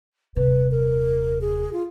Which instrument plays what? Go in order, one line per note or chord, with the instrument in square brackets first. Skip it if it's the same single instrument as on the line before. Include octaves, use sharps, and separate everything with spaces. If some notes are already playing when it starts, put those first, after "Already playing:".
[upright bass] D#1 C3 [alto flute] B4
[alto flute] A#4
G#4
F4